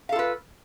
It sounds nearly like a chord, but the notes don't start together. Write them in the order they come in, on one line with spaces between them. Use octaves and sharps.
F5 A4 F4 B4